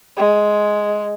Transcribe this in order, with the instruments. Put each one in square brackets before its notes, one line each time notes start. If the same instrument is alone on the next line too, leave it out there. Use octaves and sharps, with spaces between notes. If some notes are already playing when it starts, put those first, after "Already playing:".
[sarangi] G#3